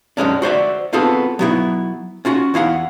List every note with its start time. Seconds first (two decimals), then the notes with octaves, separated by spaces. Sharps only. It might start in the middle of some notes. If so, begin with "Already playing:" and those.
0.17 F#2 G#3 C#4 D4
0.42 F#4 C5 D5 E5
0.93 B3 C4 F4 F#4 G#4 A4
1.39 F#3 B3 E4
2.25 C#4 F4 F#4
2.54 E2 E4 F5 F#5